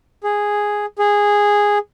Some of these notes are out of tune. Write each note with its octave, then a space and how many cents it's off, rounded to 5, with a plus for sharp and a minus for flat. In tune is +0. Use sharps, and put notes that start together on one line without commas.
G#4 -5
G#4 -10